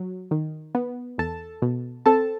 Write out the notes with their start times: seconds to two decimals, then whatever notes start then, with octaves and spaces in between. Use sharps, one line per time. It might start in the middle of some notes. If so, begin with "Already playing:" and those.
Already playing: F#3
0.31 D#3
0.75 B3
1.18 E2 A4 A5
1.62 B2
2.06 C4 A4 A5